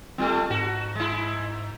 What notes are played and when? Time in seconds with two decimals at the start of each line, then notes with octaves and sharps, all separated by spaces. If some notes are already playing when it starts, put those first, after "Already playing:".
0.18 G3 A3 C4 F4 F6
0.50 G#2 F#4
0.95 G#3 E4